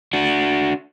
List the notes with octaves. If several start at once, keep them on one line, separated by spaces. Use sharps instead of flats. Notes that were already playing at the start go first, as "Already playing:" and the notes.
D4 F#4